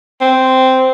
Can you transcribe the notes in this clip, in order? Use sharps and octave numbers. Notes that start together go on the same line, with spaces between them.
C4